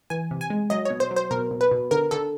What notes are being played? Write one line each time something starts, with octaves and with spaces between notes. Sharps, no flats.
E3 G#5
C3
G#5
G#3
F#3 D#5
B2 C#5
C5
F#3
C5
B2 A#4
B2
B4
B2
D3 A#4
D3 A4